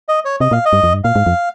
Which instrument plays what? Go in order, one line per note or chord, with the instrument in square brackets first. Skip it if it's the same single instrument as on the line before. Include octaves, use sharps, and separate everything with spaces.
[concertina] D#5
C#5
[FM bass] C3 [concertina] D#5
[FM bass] A#2 [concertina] F5
[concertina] D#5
[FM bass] G2
F2
G2
[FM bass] A#2 [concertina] F5
[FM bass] G#2
F2